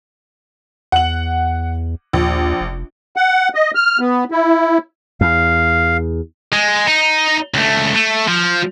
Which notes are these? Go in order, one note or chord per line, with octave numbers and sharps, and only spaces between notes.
E2 F#5 F#7
A#1 D#2
F1
F#5
D#5
F6
B3
E4
E2 F5
G#3
D#4
C#2 A3
A3
F3